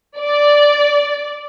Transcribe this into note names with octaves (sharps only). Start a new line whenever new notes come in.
D5